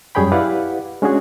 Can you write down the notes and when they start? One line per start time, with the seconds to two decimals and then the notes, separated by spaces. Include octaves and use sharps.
0.15 F#2 G3 G#4 C#5 G5 B5
0.32 E4 G4 B4 D5 F5 F#5
1.02 G#3 C#4 D4 F#4 G#4